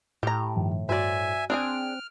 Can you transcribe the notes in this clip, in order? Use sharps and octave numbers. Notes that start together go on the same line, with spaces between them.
A2 G4 A#5
G2 D#3 F3
G2 F#4 C5 D5 E5 G#5
C4 D4 G#4 G#5 F6 F#6 D7